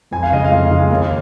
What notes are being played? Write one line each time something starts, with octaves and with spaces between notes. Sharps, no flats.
F2 G#5
F5
C#3 G#3 D#5
F5
F2
C#3 G#3
D#2